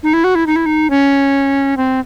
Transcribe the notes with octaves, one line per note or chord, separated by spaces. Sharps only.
D#4
E4
F#4
E4
D#4
E4
D#4
C#4
C4